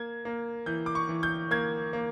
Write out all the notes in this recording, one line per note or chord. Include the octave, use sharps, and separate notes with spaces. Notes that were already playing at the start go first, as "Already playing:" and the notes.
Already playing: A#3 G#6
A#3
E3 G6
D6
C#6
E3
G6
A#3 G#6
A#3